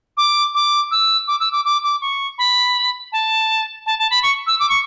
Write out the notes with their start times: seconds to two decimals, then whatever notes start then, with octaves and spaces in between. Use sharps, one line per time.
0.17 D6
0.54 D6
0.91 E6
1.27 D6
1.40 E6
1.52 D6
1.65 D6
1.83 D6
2.01 C#6
2.38 B5
3.12 A5
3.86 A5
3.98 A5
4.10 B5
4.23 C#6
4.47 E6
4.59 D6
4.69 C#6